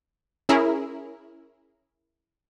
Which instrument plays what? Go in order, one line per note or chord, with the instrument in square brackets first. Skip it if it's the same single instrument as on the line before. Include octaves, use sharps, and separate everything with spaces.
[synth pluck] C#4 E4 G#4 A#4